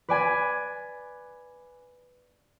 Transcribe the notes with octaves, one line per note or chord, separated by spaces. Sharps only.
B4 D5 G#5